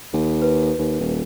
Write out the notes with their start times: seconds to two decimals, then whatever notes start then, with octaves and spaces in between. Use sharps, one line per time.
0.13 D#2
0.42 B4
0.79 D#2
1.00 D#1